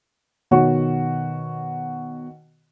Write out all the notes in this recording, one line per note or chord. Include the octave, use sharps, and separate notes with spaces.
B2 D#3 F#4 C#5 C#6